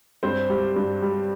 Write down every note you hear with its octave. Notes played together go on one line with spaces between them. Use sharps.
G2 C4 C5
G3
G2
G3